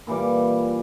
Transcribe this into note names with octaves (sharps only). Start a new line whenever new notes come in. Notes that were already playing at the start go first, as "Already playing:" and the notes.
A#2 E3 G3 D6